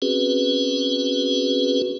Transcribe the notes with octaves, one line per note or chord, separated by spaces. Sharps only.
C4 C#4 F#4 G#4 B4